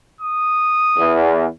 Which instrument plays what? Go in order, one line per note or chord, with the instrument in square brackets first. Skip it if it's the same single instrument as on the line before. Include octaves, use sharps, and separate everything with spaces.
[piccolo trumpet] D#6
[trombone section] E2